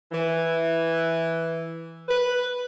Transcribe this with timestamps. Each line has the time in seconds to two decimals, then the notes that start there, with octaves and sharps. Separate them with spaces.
0.12 E3
2.09 B4